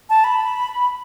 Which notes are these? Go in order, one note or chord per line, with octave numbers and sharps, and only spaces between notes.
A5
B5